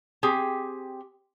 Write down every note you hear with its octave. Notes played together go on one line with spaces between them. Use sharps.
C4 G4 G#4